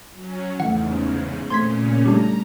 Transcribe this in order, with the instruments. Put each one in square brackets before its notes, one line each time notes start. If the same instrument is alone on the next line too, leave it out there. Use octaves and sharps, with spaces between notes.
[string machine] F#3 C#4
[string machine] E2 G#2 C#3 [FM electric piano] E3 A3 [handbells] F#5
[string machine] A#2 C#3 C#4 [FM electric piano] A3 C4 [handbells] C6 G#6 B6
[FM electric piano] G3 A3 [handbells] D4 G4 [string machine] A#5